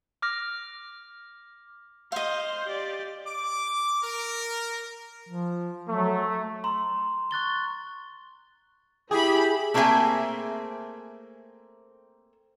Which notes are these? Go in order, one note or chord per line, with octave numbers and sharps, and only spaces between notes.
D6 F6 A#6
C5 D#5 F5
G4 D5
D6
A#4
F3
F#3 A3
A#5 C6
C#6 F#6 A6 G7
E4 G4 G#4 B5
A3 A#3 C4 G#4 E5 G#5